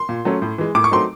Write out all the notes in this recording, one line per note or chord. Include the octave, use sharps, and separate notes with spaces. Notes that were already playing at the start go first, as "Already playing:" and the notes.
Already playing: C6
A#2
F#3 A3 C#4
A2
E3 G#3
A2 D6
C#6
F#3 A3 C4 D#4 C6